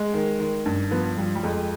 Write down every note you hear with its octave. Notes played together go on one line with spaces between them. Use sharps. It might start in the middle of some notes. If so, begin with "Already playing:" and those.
Already playing: G#3
D#3
D#3
G2
F3 B3
F3 G3
G3
F2 G#3